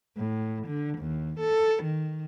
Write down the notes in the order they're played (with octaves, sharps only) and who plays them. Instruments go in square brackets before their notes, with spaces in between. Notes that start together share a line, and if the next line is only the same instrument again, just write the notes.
[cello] A2
D3
D#2
A4
D#3